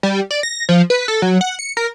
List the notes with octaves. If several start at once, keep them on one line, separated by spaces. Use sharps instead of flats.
G3
D5
A#6
F3
B4
A4
F#3
F#5
C#7
A#4